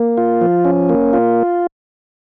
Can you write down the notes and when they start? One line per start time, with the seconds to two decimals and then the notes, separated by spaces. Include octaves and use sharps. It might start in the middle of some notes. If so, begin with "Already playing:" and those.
Already playing: A#3
0.18 F4
0.41 F3
0.65 C#4
0.89 A#3
1.13 F4